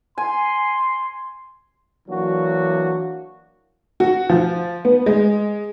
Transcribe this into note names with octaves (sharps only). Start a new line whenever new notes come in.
G#5 C6
E3 F#3 A#3 D4 F#4
F#4
F3
B3
G#3